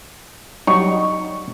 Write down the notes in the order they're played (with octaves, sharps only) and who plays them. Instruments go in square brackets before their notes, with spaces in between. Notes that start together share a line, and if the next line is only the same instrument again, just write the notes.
[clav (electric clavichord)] F#3 G3 D#4 [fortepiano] C#6